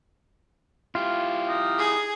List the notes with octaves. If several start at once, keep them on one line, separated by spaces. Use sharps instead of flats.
E4 F4 G4
D#4
G#4